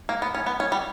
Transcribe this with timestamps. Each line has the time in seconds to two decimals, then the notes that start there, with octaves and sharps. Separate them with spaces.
0.09 A#3
0.22 B3
0.35 C#4
0.46 B3
0.60 C#4
0.72 G3